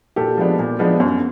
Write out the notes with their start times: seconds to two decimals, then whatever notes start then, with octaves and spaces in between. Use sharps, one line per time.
0.16 A#2 G4 A4
0.37 F3 G#3 B3 D4
0.59 A#2
0.79 F3 G#3 B3 D4
1.00 F#2